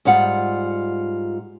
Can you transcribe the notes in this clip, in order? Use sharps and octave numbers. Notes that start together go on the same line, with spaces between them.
G#2 G3 F4 F#5